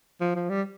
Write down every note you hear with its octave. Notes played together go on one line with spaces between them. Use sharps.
F3
F3
G3